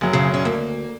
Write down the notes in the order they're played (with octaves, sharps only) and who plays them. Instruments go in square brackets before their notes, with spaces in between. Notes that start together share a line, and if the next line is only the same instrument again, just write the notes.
[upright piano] F#1 F#3
[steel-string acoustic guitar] C#3
C#4
[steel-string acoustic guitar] D2 [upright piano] A#3